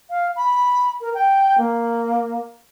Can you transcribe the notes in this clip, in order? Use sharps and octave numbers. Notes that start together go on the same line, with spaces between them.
F5
B5
A#4
G5
A#3